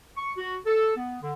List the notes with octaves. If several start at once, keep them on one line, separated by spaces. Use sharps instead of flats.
C#6
F#4
A4
B3
D3